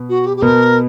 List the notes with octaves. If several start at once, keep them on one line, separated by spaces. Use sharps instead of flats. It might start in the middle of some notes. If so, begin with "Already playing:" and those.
Already playing: B2 B3
F#4
G4
G4
B2 B3 A#4